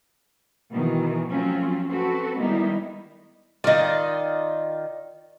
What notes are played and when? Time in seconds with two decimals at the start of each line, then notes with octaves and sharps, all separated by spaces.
0.72 B2 D#3 E3
1.31 F3 F#3 A3 C4 C#4 F4
1.90 C4 F#4 A4 B4
2.38 D#3 G3 G#3 B3 D#4 E4
3.64 D#3 F4 D5 D#5